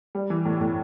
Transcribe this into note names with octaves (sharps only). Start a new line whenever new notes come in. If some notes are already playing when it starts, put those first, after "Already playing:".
G3
E3
A2
A2